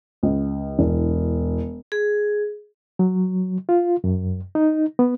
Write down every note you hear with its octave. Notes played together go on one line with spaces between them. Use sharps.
C#2
E1
G#4
F#3
F4
F#2
D#4
B3